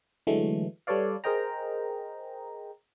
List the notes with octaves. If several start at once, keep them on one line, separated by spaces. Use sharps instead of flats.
D3 E3 F#3 G#3 A3
G3 A4 B4 C#5 D5 F5
G#4 A#4 C5 D#5 G5 A#5